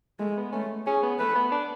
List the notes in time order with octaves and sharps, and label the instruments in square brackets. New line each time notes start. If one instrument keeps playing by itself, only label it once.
[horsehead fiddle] G#3 [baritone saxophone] A3
[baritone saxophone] B3
[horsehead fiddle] A3 [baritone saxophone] C#4
[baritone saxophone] C#4 [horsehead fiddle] G#4
[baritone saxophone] B3
[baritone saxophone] A3 [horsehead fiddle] B4
[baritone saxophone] B3
D4